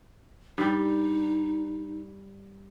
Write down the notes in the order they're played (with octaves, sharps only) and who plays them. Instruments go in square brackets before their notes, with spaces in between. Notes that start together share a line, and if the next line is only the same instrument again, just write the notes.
[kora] G2 G3 [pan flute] D#4